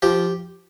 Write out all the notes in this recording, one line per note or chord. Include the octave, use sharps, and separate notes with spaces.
F3 G4